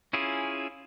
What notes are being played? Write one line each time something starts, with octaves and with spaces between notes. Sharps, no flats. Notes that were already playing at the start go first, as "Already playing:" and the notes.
C#4 E4 F4 G#4